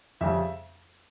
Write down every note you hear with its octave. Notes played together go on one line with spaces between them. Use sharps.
F2 C#3 G3 E5